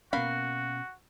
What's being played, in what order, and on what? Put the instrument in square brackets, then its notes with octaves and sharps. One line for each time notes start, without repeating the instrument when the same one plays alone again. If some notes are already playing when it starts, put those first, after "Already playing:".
[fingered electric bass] B2 B3 C#4 [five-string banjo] A#3 F5 B5 [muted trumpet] F#4